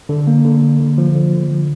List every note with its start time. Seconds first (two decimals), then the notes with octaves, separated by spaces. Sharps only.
0.09 D3
0.27 A#3
0.45 D3
0.63 A#3
0.80 D3
0.98 F3
1.15 D3
1.33 D3
1.51 F3